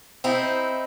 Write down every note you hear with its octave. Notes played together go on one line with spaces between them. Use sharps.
C4 D#4 E4